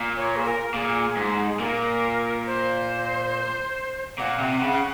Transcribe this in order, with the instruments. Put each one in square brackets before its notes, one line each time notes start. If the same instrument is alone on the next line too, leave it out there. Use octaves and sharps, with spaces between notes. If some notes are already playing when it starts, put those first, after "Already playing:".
Already playing: [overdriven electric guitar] A#2
[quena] C#5
G#4
A#4
[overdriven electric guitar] A#2 [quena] G#4
[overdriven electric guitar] G#2
[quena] G#4
[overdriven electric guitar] A#2 [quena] A#4
[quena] C5
[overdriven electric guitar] A#2 [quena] F#5
[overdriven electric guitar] C3
C#3